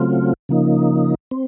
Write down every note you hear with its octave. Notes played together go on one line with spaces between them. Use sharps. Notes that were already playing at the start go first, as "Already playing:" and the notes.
Already playing: C#3 F#3 A3 C4 F4
C#3 F3 A#3 D#4
C4